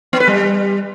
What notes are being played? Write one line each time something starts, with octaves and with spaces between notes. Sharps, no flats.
B3
B4
G3